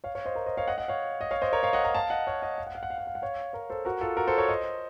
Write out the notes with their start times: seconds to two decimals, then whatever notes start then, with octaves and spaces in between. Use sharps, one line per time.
0.04 C#5 F5
0.15 C#5 F5
0.25 C5 D#5
0.35 A#4 C#5
0.46 C5 D#5
0.57 C#5 F5
0.68 D#5 F#5
0.78 D#5 F#5
0.88 C#5 F5
1.21 D#5
1.31 C#5 F5
1.42 C5 D#5
1.53 A#4 C#5
1.63 C#5 F5
1.73 D#5 F#5
1.84 F#5 A#5
1.95 F5 A5
2.10 D#5 F#5
2.27 C#5 F5
2.42 D#5 F#5
2.58 F5
2.67 F#5
2.75 F5
2.83 F#5
2.90 F5
2.98 F#5
3.07 F5
3.15 F#5
3.22 C#5 F5
3.53 A#4 C#5
3.70 A4 C5
3.85 F#4 A#4
4.01 F4 A4
4.17 F#4 A#4
4.27 A4 C5
4.38 A#4 C#5
4.49 C5 D#5